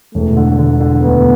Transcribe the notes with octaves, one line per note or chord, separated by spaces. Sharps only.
E1 A3
D3
D3
D3
D2 B3